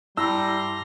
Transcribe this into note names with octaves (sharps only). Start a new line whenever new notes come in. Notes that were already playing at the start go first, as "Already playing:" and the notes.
G2 G3 E4 A5 A#5 C6 E6